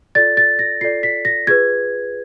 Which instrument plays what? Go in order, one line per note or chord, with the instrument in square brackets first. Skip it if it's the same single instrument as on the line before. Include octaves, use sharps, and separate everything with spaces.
[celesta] F4 A4 D5 A6
A6
A#6
F4 A4 D5 C7
B6
A#6
F4 G#4 B4 G#6